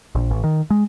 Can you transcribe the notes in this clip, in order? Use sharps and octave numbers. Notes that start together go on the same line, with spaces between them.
A#1
A1
D#3
G#3